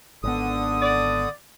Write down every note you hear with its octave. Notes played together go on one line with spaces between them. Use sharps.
G#1 D3 B3 D#6
D5